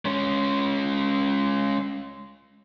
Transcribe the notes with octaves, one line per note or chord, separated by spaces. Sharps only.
G#3 C#4